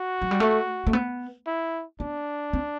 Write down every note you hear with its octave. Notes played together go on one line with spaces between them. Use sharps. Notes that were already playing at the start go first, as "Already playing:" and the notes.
Already playing: F#4
F#3
G3
A3
A3
B3
E4
B3 D4
C4